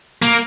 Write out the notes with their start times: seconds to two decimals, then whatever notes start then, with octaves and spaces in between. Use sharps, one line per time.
0.22 A#3